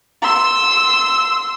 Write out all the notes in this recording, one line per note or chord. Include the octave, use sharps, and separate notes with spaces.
C6 E6